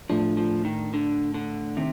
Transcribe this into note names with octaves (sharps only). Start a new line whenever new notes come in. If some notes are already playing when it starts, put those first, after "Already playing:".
A2 F3 A3 D4
F3
D#3
D3
D3
C3 D#3